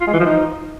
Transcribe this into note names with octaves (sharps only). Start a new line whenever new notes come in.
F4
G#3
E3
F3
D#4